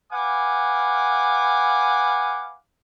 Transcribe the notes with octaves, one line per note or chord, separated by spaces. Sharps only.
B4 F5 F#5 G#5 D6